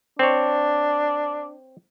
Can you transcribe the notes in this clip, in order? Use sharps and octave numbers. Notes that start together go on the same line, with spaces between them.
C4 D4 C#5